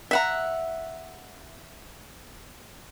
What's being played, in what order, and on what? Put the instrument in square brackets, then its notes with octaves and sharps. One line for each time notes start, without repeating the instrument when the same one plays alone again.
[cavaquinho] E5 F#5 A#5